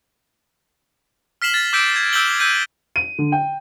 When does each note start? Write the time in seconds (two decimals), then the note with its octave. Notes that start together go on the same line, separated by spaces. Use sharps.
1.42 F6 B6 C7 E7 F#7
1.54 A6
1.73 D6 E6 G6 B6 D7
1.96 G#6
2.13 E6 G6 B6 D7 F#7 G7
2.40 E6 G6 B6 D#7
2.96 D#7
3.18 D3
3.32 G5